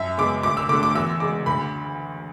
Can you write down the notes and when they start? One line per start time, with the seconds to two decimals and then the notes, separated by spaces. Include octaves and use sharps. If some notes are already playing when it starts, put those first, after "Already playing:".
Already playing: F#2 E5
0.18 C#3 G#3 B3 D6
0.43 D2 D6
0.57 E6
0.69 D3 A3 D6
0.83 D6
0.95 E2 E6
1.20 C#3 G#3 D6
1.46 D2 B5